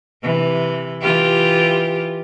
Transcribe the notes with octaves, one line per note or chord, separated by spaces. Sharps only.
C3 E3
E3 F4 G4